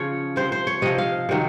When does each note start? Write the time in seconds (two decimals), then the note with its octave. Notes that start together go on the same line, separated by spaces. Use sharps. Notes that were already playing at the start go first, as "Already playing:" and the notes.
Already playing: C#3 F3 C#5
0.36 C3 F3 C5
0.52 C5
0.67 C#5
0.82 C3 F3 D#5
0.98 F5
1.29 C3 D#3 F#3